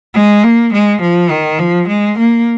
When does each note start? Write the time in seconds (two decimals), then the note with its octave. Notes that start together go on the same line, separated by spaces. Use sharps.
0.14 G#3
0.43 A#3
0.73 G#3
1.01 F3
1.30 D#3
1.59 F3
1.88 G#3
2.18 A#3